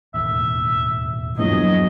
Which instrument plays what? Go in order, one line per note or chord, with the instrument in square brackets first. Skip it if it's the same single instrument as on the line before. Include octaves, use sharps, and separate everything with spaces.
[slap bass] E1 D#2 A2 [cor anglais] E5
[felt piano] A#1 E2 G2 [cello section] F#3 [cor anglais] D#5